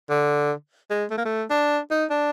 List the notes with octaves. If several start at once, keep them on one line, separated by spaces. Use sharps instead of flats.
D3
G#3
A3
A#3
A3
D4
D#4
D4